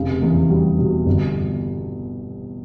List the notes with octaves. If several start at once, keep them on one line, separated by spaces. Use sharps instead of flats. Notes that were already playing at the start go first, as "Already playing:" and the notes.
Already playing: F1 C#3
E2
G3
B2
G1